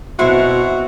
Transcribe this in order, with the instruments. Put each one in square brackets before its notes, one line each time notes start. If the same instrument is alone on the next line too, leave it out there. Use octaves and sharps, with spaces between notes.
[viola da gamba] B2 C4 [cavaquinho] E4 C5 E5 [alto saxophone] F#4